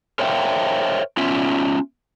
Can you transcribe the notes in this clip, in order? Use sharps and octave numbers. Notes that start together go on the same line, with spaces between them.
A#4 C5 C#5 E5 F5 G5
B3 C#4 F4 E5